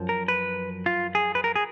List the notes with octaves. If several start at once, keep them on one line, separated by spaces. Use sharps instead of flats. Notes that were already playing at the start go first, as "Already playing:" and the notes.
Already playing: F#2 F3
A#4
B4
F4
G#4
B4
A#4
G#4